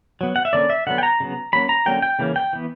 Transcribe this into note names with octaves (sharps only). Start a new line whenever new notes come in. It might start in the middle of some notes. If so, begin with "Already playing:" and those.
F#3 B3
F#5
E5
D3 A#3 C#4 D5
E5
D3 F#3 B3 F#5
G5
A#5
C#3 F#3 B3
F#3 A#3 C#4 B5
A#5
D3 F#3 A#3 C#4 G5
G5
C#3 E3 A#3 C#4
G5
E3 B3